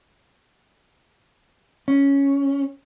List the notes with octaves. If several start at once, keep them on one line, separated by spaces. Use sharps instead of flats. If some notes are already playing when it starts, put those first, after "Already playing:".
C#4